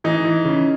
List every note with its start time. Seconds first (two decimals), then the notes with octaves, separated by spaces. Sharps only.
0.04 E3 D#4
0.25 E3
0.45 C#3